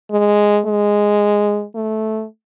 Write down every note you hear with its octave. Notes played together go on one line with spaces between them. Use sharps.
G#3
G#3
A3